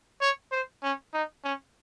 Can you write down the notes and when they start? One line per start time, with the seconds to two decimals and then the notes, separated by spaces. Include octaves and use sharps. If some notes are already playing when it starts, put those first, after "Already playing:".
0.21 C#5
0.52 C5
0.83 C#4
1.13 D#4
1.44 C#4